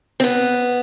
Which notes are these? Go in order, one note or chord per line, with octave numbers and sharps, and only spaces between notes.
C4
B3